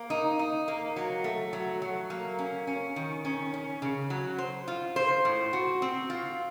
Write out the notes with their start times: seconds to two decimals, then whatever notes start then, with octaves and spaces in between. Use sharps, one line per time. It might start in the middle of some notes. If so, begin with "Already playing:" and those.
Already playing: A#3
0.10 D#4
0.39 D#4
0.68 A#3
0.96 F#3
1.24 A3
1.53 F#3
1.82 F#3
2.10 A#3
2.39 C#4
2.67 C#4
2.96 D#3
3.25 C#4
3.54 C#4
3.82 C#3
4.10 F#3
4.38 C5
4.68 F4
4.96 C5
5.25 A2
5.53 F#4
5.82 C4
6.10 F4